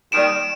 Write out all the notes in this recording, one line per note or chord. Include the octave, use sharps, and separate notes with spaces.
D#2 D#3 G3 D7 E7